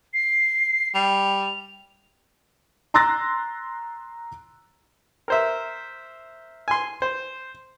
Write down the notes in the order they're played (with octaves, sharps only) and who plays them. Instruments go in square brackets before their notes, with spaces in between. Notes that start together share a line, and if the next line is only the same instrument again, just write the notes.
[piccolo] C7
[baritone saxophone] G3 [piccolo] F7
[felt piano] A#5 C6 E6 F#6 A6 A#6
[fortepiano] A#4 C5 E5
G#5 C6
C5